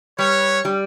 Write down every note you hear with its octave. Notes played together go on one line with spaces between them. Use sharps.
G3 B4 C#5
G3